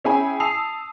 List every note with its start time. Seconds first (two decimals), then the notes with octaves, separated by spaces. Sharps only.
0.04 C#4 E4 G#4 G5 G#5 B5
0.40 A5 D#6 E6 C7 F7